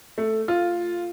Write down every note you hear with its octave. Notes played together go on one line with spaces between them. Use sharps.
A3
F4